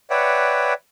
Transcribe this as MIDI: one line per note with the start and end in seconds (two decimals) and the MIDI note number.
0.10 0.73 71
0.10 0.73 73
0.10 0.73 74
0.10 0.73 76
0.10 0.73 78
0.10 0.73 79